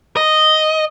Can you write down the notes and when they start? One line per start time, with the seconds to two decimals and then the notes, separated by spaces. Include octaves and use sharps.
0.17 D#5